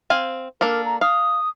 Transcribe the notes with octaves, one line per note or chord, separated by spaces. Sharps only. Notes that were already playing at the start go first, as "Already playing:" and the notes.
C4 F5 G#5
A#3 D4 A4 A#4
A#5
F5 D#6